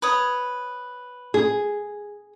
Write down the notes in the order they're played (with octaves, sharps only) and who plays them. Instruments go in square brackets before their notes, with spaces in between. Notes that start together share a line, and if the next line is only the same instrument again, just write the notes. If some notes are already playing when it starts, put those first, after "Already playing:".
[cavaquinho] B4 C#5 D#6
[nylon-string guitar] G#4